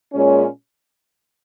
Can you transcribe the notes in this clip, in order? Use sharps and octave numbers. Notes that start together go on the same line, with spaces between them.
A#2 G#3 C#4